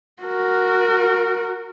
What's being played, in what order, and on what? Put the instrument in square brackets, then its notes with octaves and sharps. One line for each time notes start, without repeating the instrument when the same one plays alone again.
[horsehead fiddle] F#4 A#4